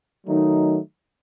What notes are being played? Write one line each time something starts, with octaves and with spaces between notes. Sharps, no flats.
D#3 F#3 A3 D#4